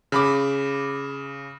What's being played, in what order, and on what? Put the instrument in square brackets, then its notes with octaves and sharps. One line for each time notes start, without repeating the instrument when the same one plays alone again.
[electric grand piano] C#3 B5 D6